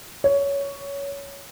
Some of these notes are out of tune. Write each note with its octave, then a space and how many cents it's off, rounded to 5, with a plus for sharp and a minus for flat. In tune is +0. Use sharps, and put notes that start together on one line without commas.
C#5 +15